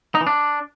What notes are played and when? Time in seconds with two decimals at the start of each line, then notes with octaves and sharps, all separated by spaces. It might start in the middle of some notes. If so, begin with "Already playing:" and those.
0.15 D#4
0.21 E3
0.27 D4